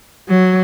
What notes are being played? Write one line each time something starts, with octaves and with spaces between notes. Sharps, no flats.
F#3